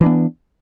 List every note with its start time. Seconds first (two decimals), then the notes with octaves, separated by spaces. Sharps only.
0.01 E3
0.03 D4
0.06 B3